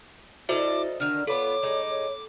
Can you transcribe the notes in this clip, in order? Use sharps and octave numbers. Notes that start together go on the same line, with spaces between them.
D4 E4 F#4 A4 C5 D#5 E5 D6
D3 D#3 D4 F6
B3 F4 A4 C#5 B5 D6
G#3 D#4
C#5